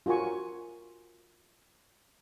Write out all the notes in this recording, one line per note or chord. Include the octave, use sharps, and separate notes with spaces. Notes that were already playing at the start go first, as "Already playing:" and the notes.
F4 F#4 A#4 G#5 C#6